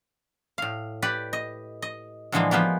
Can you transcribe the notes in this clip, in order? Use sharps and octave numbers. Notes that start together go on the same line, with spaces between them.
A2 F5
G4 B4 D5
D#5
D#5
A2 D3 E3 F3 G#3 A#3
F3 G#3 A#3 B3 G4